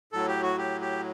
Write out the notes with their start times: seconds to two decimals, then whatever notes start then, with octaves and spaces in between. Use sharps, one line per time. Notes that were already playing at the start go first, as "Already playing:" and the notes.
0.13 A2 F#3 A4
0.28 G4
0.43 F#4
0.58 G4
0.81 G4